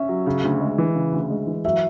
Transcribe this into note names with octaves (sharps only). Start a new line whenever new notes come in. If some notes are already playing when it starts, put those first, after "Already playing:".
Already playing: C#4 E5
F#3
C#3
D2
G#3
E3
C#3
D2
G#3
E3
F#3 E5